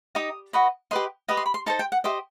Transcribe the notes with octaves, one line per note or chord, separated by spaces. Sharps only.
D#4 G4 D#5 D#6
F#4 B4 D#5
G4 B4 D#5 C6
G4 B4 D#5 D#6
C6
B5
C6
D#4 A4 C5 A5
G5
F#5
G4 C5 D#5 E5